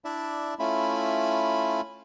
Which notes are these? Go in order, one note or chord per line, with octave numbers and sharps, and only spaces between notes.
D4 E4 D5 E5
A3 C#4 E4 F4 B5